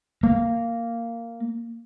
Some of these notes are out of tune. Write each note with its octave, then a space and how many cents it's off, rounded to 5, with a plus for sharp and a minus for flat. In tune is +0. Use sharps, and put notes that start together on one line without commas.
A#3 -10